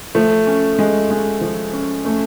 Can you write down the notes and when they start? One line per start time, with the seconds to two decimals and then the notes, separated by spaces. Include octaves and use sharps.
0.15 F3 A3
0.47 C#4
0.79 G#3
1.10 G#3
1.41 F3
1.73 C#4
2.05 A3 C#4